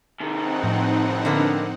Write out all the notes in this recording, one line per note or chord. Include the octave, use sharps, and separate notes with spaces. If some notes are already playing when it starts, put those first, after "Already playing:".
C3 D#3 C4 D#4 F#5
A2 F3
D3 A#3 B3